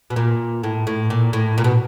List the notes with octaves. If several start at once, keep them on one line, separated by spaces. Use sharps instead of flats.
B2
A#2
A2
A2
A#2
A2
A#2
B2